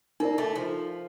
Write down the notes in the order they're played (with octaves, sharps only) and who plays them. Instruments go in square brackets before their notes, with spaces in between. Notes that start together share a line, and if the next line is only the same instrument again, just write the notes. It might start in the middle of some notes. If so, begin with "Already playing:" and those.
[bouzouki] A#3 [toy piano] D#4 A#4 D5
[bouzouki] A3
F3